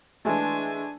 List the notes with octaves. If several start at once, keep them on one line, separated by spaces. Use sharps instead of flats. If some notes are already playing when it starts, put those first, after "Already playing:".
E3 G#3 A3 D4 G#5